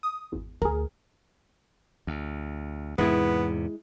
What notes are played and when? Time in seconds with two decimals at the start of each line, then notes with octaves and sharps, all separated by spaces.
0.03 D#6
0.32 G#1 E2
0.62 D2 G#4 A#4
2.07 D2
2.98 E2 G#2 C3 G#3 B3 E4